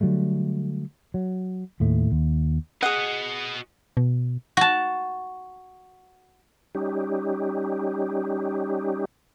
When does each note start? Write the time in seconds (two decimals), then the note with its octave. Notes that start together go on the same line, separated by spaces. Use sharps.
0.01 D3 F#3 G3 A3
1.14 F#3
1.80 D#2 A2 A3
2.12 D#2
2.82 F#4 G#4 D#5 F#5
3.97 B2
4.57 F#4 A5
6.75 G3 C#4 D#4 G4